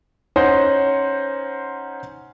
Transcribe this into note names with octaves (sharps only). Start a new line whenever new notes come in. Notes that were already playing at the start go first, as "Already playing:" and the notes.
C#4 D#4 C5 C#5 F#5 C6